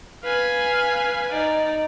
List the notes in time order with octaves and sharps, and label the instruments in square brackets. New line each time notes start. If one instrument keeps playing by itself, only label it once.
[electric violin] B4 G#5 [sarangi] F5
[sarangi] D#4 [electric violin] D5